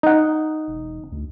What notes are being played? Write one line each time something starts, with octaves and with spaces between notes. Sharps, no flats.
D#4 F#5
E1
D2